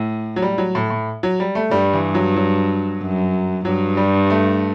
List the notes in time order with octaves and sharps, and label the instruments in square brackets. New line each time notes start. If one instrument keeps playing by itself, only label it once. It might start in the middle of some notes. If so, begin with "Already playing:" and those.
Already playing: [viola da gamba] A2
[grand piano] F#3
G3
F#3
A2
A2
F#3
G3
A3
[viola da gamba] G2 [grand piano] G3
[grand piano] E3
F#3
F#3
[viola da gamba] F#2
[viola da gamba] G2 [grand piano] F#3
[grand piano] G3
A3